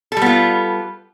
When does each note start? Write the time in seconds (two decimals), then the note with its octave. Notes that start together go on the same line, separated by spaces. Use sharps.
0.12 A4
0.17 G3
0.21 B3
0.26 F4